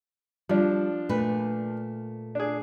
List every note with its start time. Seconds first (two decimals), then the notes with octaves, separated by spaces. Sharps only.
0.49 F3 G3 D4
1.09 A#2 A3 B4
2.35 D4 G#4